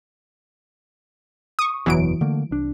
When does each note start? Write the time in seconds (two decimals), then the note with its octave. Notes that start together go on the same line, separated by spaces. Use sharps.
1.59 C#6 D#6
1.86 F#1 E2 B2 E3 F#3 D7
2.21 D3 A3 A#3
2.51 C2 D4